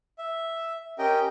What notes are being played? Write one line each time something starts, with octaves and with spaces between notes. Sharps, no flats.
E5
C#4 G4 A#4 D#5 G5